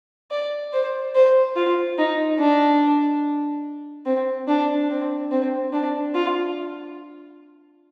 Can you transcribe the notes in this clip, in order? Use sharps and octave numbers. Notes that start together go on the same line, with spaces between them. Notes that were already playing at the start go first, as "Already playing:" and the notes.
D5
C5
C5
F4
D#4
D4
C4
D4
C4
C4
D4
F4